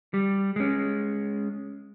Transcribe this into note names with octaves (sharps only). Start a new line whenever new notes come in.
G3
G#3 C#4